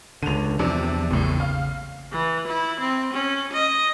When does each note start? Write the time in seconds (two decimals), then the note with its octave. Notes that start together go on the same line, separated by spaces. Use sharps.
0.23 C#2 D3 D#7 F7
0.59 E2 C3 F3 D4
1.11 A1 D#2 A2 C#3
1.40 F5
2.12 E3
2.48 E4
2.80 C4
3.13 C#4
3.53 D#5